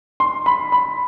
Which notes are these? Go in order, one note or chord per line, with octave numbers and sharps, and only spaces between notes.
C6
B5
B5